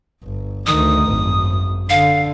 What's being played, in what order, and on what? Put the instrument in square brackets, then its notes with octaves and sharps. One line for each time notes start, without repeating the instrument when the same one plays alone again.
[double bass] G1
[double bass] D2 D#3 [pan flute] D#6
[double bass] G#1 F#2
[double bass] D3 [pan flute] F5